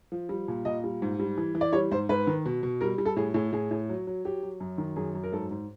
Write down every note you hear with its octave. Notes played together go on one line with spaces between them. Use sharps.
F3
G3
A#2
A#2 D#5
G3
G#2
G3
E3
E3
D5
G3 C#5
G#2 C5
G#2 B4
D#3
B2
B2
G3 A#4
G3
A4
A2 G#4
A2 G#4
A2 G#4
A2
F#3
F#3
F#3 G4
F#3
F#2
D#3
F#2 G#4
F#2
A#4
G#2 A4
G#2